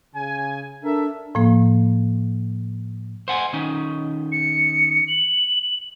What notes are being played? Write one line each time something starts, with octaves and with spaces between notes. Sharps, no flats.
C#3 G#5
D4 A4 A#4 E5
A2 F3 A#3
C5 F#5 G#5
D#3 C#4 D#4
C#7
F#7